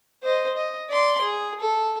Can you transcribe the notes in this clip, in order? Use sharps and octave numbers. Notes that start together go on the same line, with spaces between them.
C5 D#5
D#5
D5 C6
G#4
A4